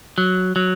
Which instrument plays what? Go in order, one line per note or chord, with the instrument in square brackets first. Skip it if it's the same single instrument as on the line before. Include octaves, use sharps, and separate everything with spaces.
[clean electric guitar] F#3
F#3